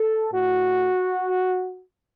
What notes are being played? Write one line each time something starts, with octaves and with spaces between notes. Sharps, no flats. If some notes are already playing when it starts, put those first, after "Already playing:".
Already playing: A4
A2 A3 F#4